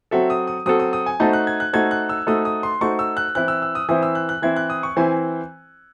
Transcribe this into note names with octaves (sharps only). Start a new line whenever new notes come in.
F#3 C4 F#4 A4 E5
D#6
D#6
F#3 C4 F#4 A4 D#6
D#6
D#6
G#5
A3 D#4 F#4 A4 C5 A5
F#6
G#6
F#6
A3 D#4 F#4 A4 C5 G#6
F#6
E6
A3 D#4 F#4 A4 C5 D#6
D#6
C6
A3 D#4 F#4 A4 C5 C#6
E6
F#6
E3 C4 E4 C5 F#6
E6
E6
D#6
E3 C4 E4 C5 D#6
E6
F#6
F#6
E3 C4 E4 C5 G#6
F#6
D#6
C#6
E3 C4 E4 C5 G#5